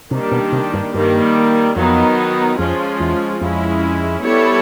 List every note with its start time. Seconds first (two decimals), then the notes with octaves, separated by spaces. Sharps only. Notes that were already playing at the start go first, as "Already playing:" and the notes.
0.11 C3 D#3 G3 A#3 D4 G4
0.31 B2
0.52 C3
0.74 G2
0.94 G2 D#3 G3 A#3
1.76 F2 D#3 F#3 B3 D#4
2.59 F2 F3 G#3 C#4 F4
3.00 E2
3.40 F2 G#3 C#4 E4
4.23 G3 B3 E4 A4 C#5